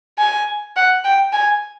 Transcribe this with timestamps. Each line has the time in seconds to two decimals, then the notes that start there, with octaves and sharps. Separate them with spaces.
0.19 G#5
0.76 F#5
1.04 G5
1.33 G#5